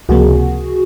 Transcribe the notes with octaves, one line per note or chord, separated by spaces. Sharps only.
C#2 C3 F3 A#3 F#4 G#4